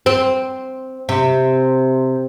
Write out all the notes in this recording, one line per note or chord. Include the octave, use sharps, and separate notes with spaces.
C4
C3